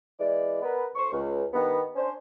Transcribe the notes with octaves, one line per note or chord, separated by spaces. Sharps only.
E3 G#3 E4 D5
B3 A#4 B4
D2 C5 C#6
C#2
G2 D#3 B3
C#4 D4 C5